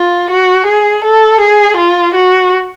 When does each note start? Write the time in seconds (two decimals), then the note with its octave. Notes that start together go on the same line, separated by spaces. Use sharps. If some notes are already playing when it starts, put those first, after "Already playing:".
Already playing: F4
0.30 F#4
0.66 G#4
1.04 A4
1.40 G#4
1.77 F4
2.14 F#4